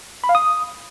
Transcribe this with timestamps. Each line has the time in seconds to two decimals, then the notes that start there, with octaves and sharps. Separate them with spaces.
0.24 B5
0.29 F5
0.35 D#6